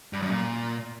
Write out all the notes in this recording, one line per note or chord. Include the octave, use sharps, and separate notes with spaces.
G2
F#2
A#2